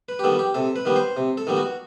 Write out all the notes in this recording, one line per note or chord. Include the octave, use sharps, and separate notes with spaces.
B4
G4
D#3 G3 B3 A4
G4
C3 A4
B4
D#3 G3 B3
C5
C3
A4
D#3 G3 B3
F#4